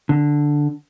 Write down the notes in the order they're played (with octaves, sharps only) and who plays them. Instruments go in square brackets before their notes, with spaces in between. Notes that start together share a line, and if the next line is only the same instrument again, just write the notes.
[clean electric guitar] D3